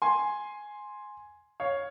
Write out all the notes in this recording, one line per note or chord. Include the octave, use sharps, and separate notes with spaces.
G#5 C6
C#5 F5